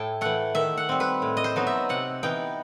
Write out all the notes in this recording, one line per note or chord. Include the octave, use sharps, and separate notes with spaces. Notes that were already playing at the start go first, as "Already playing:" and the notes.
Already playing: A2 E4 E5 G5 A5
E3 A3 F#5
D#3 E5
F#5
G3 C4
B4
A2
D#5
C5
F#3 B3 D#4
E5
C3 F#5
E3 B3 D#4 G5